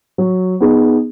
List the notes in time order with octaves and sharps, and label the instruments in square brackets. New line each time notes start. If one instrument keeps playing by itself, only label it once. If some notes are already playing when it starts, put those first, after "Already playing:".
[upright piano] F#3
B3 D#4 G#4